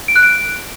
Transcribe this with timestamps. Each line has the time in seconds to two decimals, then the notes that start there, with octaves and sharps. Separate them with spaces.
0.08 D7
0.16 F#6
0.23 D7